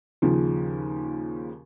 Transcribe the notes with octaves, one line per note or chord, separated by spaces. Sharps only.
D#2 C#3 F3